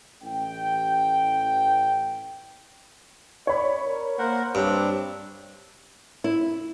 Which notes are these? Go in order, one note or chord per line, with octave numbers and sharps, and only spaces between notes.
A1 G5
C#5 D5 B5
A#4
A#3 A#4 C5 F#5
G2 C4 D4 C#5
E4